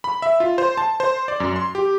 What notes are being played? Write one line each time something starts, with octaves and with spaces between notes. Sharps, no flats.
B5
E5
F4
C5
A5
C5
D5
F#2
C6
G4